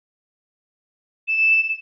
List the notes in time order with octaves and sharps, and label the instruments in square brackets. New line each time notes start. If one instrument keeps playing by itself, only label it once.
[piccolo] E7